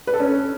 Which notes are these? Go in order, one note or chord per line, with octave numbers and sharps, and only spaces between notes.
B4
A4
C#4